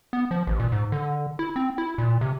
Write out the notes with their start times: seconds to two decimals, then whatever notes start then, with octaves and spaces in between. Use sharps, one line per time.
0.13 B3
0.31 F3
0.47 A1
0.60 A#2
0.72 G#2
0.92 D3
1.39 E4
1.56 C4
1.78 E4
1.98 A#2
2.21 C3